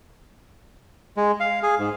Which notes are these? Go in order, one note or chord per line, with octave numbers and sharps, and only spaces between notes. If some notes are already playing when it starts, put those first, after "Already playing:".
G#3
F5
G#4
G#2